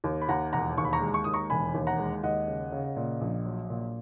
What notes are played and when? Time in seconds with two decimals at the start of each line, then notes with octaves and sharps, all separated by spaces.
0.04 D#2
0.21 B5
0.28 D#2 F#5 A#5
0.53 E1 F#5 A#5
0.77 D#2 C#6
0.85 B5
0.93 A#5 C#6
1.01 G#3
1.14 C#6
1.24 D#2 D#6
1.34 A#5 C#6
1.50 E1 G#5 B5
1.74 D#2
1.87 F#5 A#5
1.99 G#3
2.23 D#2 D#5 F#5
2.48 C#3
2.72 C#3
2.96 A#2
3.21 A#1
3.45 F#3
3.70 A#2